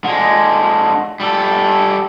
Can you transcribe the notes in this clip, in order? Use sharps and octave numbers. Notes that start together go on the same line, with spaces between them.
D3 G#3
G3 A4